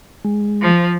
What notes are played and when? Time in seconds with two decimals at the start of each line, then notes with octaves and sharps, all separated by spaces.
0.25 G#3
0.61 F3